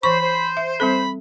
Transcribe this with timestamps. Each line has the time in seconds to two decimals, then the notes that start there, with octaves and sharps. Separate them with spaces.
0.03 E3 C5 B5 C#6
0.20 C5
0.57 E5
0.80 G3 C4 A4 B5